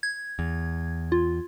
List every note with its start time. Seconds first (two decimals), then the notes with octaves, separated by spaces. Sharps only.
0.03 G#6
0.39 E2
1.12 F4